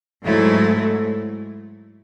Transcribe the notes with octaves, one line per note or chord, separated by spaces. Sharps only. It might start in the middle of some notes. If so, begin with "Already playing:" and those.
G#2 F#3 A3 E4